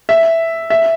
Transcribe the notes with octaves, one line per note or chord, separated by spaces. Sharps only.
E5
E5